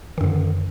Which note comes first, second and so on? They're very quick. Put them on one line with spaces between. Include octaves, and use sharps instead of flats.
D#3 F#2 D3